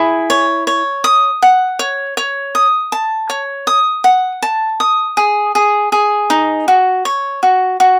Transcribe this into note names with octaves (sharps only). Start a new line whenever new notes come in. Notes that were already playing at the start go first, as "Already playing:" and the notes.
Already playing: E4 G#4
C#5
C#5
D#6
F#5
C#5
C#5
D#6
A5
C#5
D#6
F#5
A5
D#6
G#4
G#4
G#4
D#4
F#4
C#5
F#4
F#4